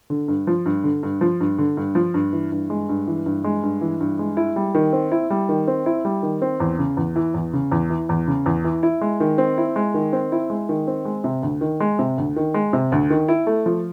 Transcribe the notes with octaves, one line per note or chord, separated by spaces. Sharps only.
D3
G2
F3
G2
D3
G2
F3
G2
D3
G2
F3
G2
E3
G2
G#3
G2
E3
G2
G#3
G2
E3
G2
G#3
E4
G3
D#3
C4
E4
G3
D#3
C4
E4
G3
D#3
C4
E2
C#3
E2
E3
E2
C#3
E2
E3
E2
C#3
E2
E3
E4
G#3
D#3
C4
E4
G#3
D#3
C4
E4
G#3
D#3
C4
G#3
C3
D2
D#3
G#3
C3
D2
D#3
G#3
C3
D2
D#3
E4
A3
F3